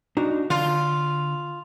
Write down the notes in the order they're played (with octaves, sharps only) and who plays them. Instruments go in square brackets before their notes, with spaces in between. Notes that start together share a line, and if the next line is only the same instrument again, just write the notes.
[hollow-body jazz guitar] D4 D#4 F#4
[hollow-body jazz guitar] D3 [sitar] F4